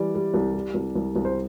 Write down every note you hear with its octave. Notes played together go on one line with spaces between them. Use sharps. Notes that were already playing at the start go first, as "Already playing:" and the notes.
Already playing: E3 G3 D5
G3
C2
G3
C2
C2
C2
C5